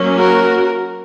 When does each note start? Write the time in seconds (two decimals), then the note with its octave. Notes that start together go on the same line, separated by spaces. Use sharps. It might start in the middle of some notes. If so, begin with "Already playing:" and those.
Already playing: F#3 A#3 C#4
0.16 F#4 A#4